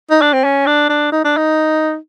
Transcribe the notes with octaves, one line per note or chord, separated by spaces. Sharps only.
D#4
D4
C4
C#4
D4
D4
D#4
D4
D#4